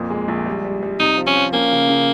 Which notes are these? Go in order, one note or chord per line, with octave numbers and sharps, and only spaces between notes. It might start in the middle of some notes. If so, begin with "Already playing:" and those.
Already playing: F2 A#2
G#3
A#1
G3
G3
G3
C3 D#4
F3
C#4
F3
A#3 C#4
C#3
C#3